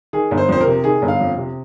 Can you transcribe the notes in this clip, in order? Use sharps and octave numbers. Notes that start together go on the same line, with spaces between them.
D#3 G#4
G1
C5
F2 C5
A#4
C3
D#3 G#4
G1
F5
F2
C3